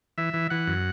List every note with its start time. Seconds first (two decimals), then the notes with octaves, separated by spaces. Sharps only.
0.18 E3 E5
0.34 E3
0.50 E3 F#5
0.67 F#2